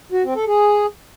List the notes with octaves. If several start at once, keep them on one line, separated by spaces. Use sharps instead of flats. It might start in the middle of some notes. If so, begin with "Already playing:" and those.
F#4
C4
A4
G#4